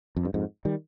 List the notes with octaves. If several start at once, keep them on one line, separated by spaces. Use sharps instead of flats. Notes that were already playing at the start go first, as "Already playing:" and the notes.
F2
G2
F2 G#2
D#3 G3